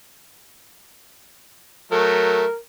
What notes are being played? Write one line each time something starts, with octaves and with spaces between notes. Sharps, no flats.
F#3 A3 A#4